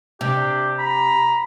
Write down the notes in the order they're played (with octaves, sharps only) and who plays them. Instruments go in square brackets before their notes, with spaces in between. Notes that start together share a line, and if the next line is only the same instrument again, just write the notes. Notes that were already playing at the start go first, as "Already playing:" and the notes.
[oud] C3 [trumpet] D4 [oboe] G4
[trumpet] A#5 [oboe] B5